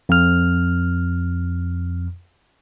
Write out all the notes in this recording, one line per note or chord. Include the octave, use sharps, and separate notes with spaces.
F2 F6